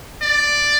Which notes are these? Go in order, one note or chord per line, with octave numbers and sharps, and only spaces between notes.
D5